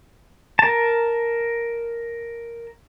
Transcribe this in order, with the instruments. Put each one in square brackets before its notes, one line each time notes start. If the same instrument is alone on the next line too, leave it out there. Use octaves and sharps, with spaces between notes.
[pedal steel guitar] A#4 A5